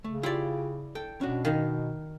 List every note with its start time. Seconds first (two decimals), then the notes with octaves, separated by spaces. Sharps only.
0.04 C#3 A3
0.23 E4 F4 G4 D5
0.95 A4 G5
1.21 B2 C#4 D4 F#4
1.45 D#3 D#4 F5